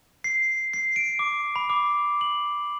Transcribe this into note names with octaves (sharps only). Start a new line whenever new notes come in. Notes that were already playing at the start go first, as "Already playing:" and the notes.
C7
C7
D7
D6
B5
D6
F#7